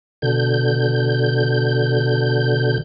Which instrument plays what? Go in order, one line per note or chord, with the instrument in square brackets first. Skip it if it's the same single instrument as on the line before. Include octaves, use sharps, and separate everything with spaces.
[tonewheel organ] B2 D3 G6